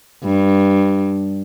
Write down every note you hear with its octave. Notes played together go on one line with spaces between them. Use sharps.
G2